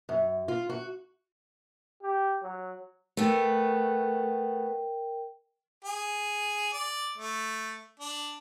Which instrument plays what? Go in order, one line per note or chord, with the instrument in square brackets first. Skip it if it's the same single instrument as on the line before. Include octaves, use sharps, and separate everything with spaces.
[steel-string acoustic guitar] F#2
F4
F#4
[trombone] G4
F#3
[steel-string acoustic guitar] A3 B3 [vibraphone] A#4 G5
[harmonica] G#4
D5
A3
D4